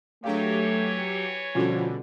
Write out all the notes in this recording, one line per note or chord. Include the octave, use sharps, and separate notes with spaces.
E3 F#3 A3 D4 G4 G#4 C#5 F5
B2 D3 F3 G3 C#4 F4 F#4